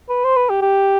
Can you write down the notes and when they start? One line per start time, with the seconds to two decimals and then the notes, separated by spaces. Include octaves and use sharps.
0.09 B4
0.24 C5
0.36 B4
0.49 G4
0.62 G4